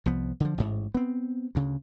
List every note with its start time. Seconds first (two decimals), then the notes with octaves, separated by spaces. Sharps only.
0.06 C2 F3 B3
0.40 D3 F3
0.58 A1 G#2
0.95 B3 C4
1.55 D2 C#3